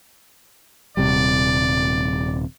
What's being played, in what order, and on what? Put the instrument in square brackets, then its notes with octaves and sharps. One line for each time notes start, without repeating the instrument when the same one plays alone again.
[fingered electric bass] D#1 C3 G3 [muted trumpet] D5